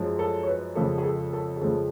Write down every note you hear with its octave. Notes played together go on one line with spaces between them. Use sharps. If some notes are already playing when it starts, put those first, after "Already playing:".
Already playing: F#2 F3 G#3
A4
C#5
B4
F2 C#3 F3 G#3 A4
G#4
A4
A4
G#4
F2 C#3 F3 G#3 A4